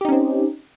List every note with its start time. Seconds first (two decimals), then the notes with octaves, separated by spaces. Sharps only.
0.01 G4
0.05 D#4
0.09 C#4
0.12 C4